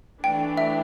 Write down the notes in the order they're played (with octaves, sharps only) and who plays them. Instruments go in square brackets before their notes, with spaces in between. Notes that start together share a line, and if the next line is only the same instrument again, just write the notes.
[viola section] E3 A3 D4 [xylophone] G5
[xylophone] E5